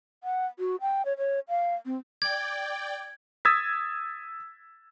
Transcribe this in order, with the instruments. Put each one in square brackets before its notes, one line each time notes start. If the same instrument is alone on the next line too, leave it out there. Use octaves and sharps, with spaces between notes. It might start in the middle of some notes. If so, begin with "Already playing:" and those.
[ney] F#5
F#4
G5
C#5
C#5
F5
C4
[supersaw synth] D5 G5 [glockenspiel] G#6
[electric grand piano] D#6 E6 G#6 A6 B6